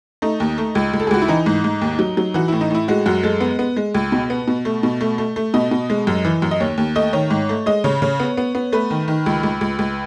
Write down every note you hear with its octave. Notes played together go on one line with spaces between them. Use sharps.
A3 D#4
D#2
A3
C#2
C#2
A4
G#4
C#2 F#4
E4
E3 D#4
G#2
G#2
D#2
F#3
F#3
E3 F#4
A2 E4
D#4
A2 E4
G#3 F#4
F#2 F#4
G#3 A4
B3
B3
G#3
C#2
B2
B3
B2
A3
B2
A3
A3
A3
B2 D#5
B2
G#3
F#2
E3
F#2
D#5
D#2 C#5
D#2
A3 D#5
D#3 C#5
G#2
A3
G#3 D#5
C#3 C#5
C#3 C#5
B3
B3
B3
A3 B4
D#3
D#3
C#2
C#2
C#2
C#2